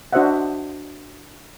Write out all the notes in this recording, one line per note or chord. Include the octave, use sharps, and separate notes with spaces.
D4 F#4 C5 D#5 E5 F#5